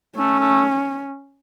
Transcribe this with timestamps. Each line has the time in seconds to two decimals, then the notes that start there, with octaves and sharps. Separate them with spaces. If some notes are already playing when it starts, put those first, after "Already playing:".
0.17 A3 C#4
0.40 A3